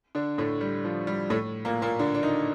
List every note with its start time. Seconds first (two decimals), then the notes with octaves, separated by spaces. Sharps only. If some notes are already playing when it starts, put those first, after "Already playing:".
0.15 D3 D4
0.38 A2 A3
0.61 G3
0.85 F3
1.07 G3
1.30 A2 A3
1.65 A#2 A#3
1.82 A#2 A#3
2.00 D3 D4
2.14 D4
2.23 D#3 D#4